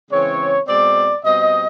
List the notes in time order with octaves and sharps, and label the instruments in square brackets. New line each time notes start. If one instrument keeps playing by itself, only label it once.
[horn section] C#3 E3 G#3 C4 C#5
B2 G#3 C4 D5
B2 G3 C4 D#5